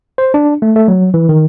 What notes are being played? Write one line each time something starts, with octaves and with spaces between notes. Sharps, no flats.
C5
D4
A3
A3
F#3
E3
D#3